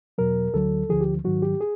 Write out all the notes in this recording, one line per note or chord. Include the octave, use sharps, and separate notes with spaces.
E2 B2 F#3 A#4
D2 D3 F#3 A4
D2 D3 F3 G#4
G4
G#2 D#3 F#3 F#4
G4
G#4